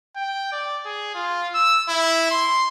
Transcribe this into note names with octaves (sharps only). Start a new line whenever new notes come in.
G5
D5
G#4
F4
E6
E4
C6